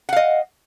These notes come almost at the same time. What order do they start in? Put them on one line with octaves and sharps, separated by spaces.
F#5 F5 D#5